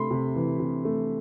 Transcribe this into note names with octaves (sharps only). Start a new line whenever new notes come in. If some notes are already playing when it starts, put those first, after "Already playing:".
Already playing: C3 A3 B5 C6
C3
E3
C3
A3